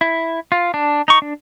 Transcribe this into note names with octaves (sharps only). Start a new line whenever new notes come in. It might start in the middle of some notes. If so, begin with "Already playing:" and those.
E4
F4
D4
D#4 C#6
D4